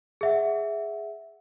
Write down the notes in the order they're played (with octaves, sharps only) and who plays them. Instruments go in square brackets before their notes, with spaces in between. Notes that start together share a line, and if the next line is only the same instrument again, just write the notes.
[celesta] G#4 E5 F#5